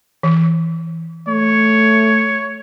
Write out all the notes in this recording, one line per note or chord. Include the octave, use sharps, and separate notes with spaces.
E3
A3 C#5